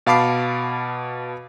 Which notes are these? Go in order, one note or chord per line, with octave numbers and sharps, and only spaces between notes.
B2 F5 A5 B5 D6 C7